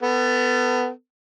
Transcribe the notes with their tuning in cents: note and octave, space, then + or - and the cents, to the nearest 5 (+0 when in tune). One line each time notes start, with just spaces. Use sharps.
B3 +20 A4 +40